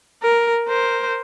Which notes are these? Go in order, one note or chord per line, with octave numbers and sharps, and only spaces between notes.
A#4
A#4 C5